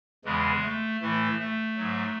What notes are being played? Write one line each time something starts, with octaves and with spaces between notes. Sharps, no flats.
E2 C#3 E3 G#3
A3
A2 E3 A3
A3
G#2 F#3